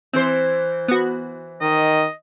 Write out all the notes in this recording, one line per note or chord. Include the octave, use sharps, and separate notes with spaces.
E3 C4 C5
B3 F#4
D#3 D#5